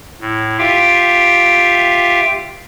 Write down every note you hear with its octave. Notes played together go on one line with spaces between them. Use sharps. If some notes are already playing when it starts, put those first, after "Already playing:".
A2
F4 G4 E5 F5 G5